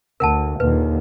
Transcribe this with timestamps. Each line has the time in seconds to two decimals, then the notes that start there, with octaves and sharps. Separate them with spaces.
0.20 D2 A#4 F#5 A5
0.60 D#2 A#2 D3 B4